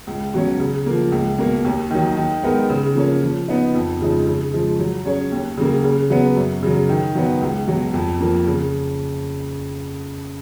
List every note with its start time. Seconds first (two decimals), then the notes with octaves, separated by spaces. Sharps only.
0.07 C#2
0.34 B2 F#3 C#4
0.60 C#3
0.86 F3 A#3
1.12 C#2
1.38 B2 A#3
1.65 D#2
1.90 D#3 F#3
2.17 D#3
2.43 G#3 B3 D#4 A#4
2.70 C#3
2.95 F3 A#3 C#4
3.22 F3
3.48 B3 D#4
3.75 F2
4.01 C#3 F3 G#3 D#4
4.27 C#3
4.53 F3 G#3
4.79 F#3
5.05 C#4 G#4 C#5
5.32 D#2
5.57 C#3 F#3 A#3
5.84 C#3
6.10 F#3 B3
6.37 F#2
6.63 C#3 F#3
6.89 D#3
7.15 F#3 B3
7.41 C#2
7.68 B2 F#3
7.94 F2
8.20 F3 A#3
8.47 C#3